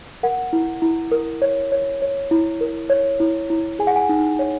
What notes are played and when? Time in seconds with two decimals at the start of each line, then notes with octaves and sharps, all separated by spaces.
0.23 A#4 F#5
0.53 E4
0.82 E4
1.12 A#4
1.42 C#5
1.72 C#5
2.02 C#5
2.31 E4
2.61 A#4
2.90 C#5
3.20 E4
3.50 E4
3.79 G#4 G#5
3.87 F#5
3.96 G#5
4.09 D#4
4.39 C#5